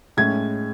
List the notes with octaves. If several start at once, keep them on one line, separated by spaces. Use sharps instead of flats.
A2 G#3 C#4 G#6